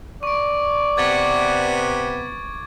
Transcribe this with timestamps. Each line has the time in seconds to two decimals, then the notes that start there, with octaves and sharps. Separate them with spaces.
0.23 D5 C#6 D7
0.97 C3 B3 D6 G#6 A6